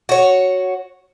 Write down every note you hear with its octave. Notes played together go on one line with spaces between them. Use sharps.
F#4 C#5